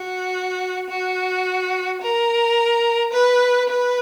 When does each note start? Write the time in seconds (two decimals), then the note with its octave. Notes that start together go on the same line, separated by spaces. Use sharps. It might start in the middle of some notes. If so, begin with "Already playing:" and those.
Already playing: F#4
0.90 F#4
2.01 A#4
3.13 B4
3.69 B4